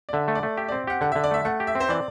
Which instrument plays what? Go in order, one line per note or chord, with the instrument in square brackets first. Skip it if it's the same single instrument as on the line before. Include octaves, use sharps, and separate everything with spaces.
[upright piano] D5
[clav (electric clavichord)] D3 [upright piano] E5
[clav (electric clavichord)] A3
[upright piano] D5
[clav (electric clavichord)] A3
[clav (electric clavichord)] G4 [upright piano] E5
[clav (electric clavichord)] C4 [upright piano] D5
[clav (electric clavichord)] G4 [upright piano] F#5
[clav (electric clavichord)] D3 [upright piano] F#5
[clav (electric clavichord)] D3 [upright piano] E5
[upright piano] D5
[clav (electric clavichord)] A3 [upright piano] E5
[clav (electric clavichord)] A3 [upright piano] F#5
[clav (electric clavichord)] G4
[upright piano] E5
[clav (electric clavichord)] C4
[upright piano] C5
[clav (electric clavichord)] E3 [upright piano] D5